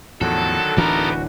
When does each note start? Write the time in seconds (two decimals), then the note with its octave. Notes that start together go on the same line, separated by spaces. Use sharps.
0.21 E2 A2 D3 D#3 F3 F#3 F#4 A4
0.77 D1 E3 B3 D4 D#4 A4 A#4 D6